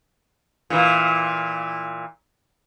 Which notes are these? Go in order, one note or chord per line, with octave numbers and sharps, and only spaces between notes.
A#2 E3